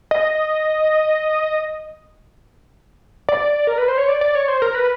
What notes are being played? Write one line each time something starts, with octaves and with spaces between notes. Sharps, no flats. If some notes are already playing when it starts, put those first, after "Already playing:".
D#5
D5
A#4
B4
C5
C#5
D5
D5
C#5
C5
A#4
B4